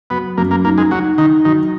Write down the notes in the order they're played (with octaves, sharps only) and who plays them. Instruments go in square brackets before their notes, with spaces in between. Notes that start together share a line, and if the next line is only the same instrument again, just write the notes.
[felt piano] F#3 [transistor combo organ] B3
[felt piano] F#2 [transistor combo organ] A#3
[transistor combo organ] A#3
[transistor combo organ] A#3 [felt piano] D#4
[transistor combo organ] G#3
[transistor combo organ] F#3 [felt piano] D#4
[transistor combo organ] D#3 [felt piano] D#4
[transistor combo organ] D#3 [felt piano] F#3